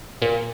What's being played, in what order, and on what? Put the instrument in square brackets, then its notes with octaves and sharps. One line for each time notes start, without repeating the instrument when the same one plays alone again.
[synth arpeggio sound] A#2